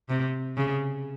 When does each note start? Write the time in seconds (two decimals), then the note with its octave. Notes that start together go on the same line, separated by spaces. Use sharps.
0.09 C3
0.57 C#3